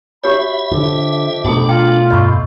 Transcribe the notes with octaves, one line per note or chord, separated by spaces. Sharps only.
F#4 G4 C#5 E5 B5
F2 D3 D6
B2 A3 D4 F#4 G#4 A4
F4 G5
E2 G2 D#5 B5 C#6